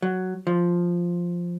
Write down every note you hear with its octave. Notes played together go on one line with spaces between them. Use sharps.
F#3
F3